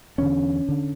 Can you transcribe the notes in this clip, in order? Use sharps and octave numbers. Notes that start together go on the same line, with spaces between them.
E2 D3 C#4
D3